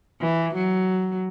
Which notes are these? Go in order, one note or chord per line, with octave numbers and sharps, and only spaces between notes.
E3
F#3